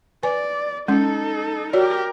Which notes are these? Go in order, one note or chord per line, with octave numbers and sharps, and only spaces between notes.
B4 D5 G#5
G#3 C#4 D#4 A4
F#4 G4 A#4 C#5 D5